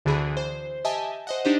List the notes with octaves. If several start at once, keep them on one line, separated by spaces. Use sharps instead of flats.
D2 D3 E3 G#4 B5
C5
G4 D#5 E5 G#5 A5
C5 D#5 F#5
D4 D#4 G4 C5